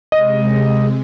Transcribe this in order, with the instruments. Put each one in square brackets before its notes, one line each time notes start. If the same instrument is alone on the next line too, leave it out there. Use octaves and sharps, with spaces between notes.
[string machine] C3 G#3 [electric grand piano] D#5